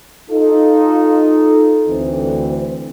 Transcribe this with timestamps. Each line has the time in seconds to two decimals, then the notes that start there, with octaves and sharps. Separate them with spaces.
0.30 D#4 F4 A4
1.88 D2 E3 C4